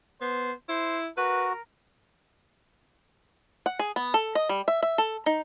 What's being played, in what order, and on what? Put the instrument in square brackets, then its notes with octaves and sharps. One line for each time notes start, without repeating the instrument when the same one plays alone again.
[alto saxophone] B3 [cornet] C5
[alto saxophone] E4 [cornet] C5
[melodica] F#4 [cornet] A#4 [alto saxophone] B4
[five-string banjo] F#5
G#4
B3
A4
D#5
G3
E5
E5
A4
D#4